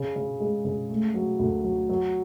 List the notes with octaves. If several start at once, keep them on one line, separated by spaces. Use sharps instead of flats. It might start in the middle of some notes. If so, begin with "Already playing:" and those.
Already playing: C#3
C#3
G#3
C#3
A3
F#3
D2
F#3
F#3